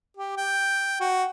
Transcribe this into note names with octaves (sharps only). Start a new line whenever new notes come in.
G4
G5
F#4